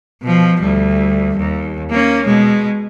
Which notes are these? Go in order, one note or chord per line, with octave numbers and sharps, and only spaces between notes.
B2 F3
D2 G3
D#2
A#3 C#4
B2 G#3